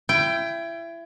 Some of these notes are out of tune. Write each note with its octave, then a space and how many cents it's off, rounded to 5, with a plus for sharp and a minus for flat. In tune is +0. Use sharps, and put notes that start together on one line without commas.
E4 +30 G5 +0